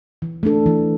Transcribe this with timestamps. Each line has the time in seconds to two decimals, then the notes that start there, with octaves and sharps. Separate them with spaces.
0.22 E3
0.43 A3 D4 A4
0.66 E3